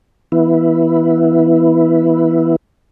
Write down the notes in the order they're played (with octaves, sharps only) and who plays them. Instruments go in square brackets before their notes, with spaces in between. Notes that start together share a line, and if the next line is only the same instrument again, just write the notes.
[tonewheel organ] E3 B3 E4